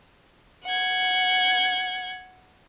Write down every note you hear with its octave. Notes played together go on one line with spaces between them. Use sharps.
F#5 G#6